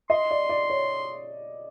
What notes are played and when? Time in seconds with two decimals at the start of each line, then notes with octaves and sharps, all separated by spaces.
0.10 D#5 C6
0.31 D5
0.49 D5
0.70 C#5